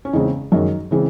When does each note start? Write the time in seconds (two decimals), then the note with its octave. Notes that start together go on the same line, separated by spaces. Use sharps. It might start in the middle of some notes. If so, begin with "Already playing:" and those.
0.05 C#4
0.13 E2 C#3 G#3 C4 D#4
0.52 F#2 D#3 G#3 D#4
0.91 C#3 E3 G#3 C4